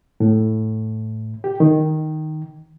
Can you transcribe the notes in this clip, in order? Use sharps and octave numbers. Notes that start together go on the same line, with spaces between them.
A2
G4
D#3